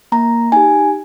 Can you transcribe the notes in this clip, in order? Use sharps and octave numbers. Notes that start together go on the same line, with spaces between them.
A#3 A#5
D#4 G4 G#5